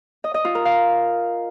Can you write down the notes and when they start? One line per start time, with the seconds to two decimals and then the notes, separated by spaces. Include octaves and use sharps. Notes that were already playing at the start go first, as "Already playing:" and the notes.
0.24 D#5
0.34 D#5
0.45 F4
0.55 A#4
0.65 F5